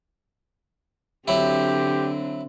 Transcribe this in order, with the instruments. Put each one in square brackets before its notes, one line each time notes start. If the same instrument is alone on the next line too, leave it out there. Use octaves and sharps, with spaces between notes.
[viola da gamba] D3 C4 D4 [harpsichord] F#3 E4 [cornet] G4